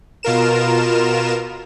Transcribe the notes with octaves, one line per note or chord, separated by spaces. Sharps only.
B2 F4 A#4 E7